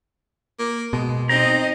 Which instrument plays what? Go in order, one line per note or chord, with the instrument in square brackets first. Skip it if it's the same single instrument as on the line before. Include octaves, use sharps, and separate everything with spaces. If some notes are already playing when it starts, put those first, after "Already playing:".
[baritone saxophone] A#3
[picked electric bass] B2 [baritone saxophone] G#3
[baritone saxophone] C4 [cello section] D#4 D#5 [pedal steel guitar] A#5